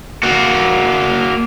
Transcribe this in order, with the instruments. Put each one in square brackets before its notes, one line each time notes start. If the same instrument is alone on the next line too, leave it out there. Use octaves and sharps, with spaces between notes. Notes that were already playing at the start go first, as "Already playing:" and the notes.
[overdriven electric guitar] A#3 F#4